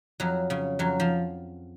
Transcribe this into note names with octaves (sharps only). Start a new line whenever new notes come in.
F2 F#3
C#3
F2 F#3
F3